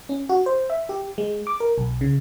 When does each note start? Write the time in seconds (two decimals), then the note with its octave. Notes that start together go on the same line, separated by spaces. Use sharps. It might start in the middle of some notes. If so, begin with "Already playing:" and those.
0.09 C#4
0.29 F#4
0.46 C5
0.70 E5
0.89 G4
1.18 G#3
1.47 D6
1.60 A#4
1.78 B1
2.01 C#3